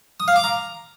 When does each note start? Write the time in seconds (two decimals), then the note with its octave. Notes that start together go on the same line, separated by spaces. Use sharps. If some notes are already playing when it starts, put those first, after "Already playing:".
0.20 D#6
0.28 F5
0.36 D6
0.44 A#5